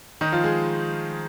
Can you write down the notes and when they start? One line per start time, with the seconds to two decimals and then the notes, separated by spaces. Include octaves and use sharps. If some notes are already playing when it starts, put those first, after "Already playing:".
0.21 D#3 D#4
0.32 F3 F4
0.43 G#3 G#4